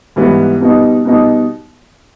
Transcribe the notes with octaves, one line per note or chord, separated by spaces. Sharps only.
G#2 E3 G3 B3
B2 G3 B3 D#4
B2 G3 B3 D#4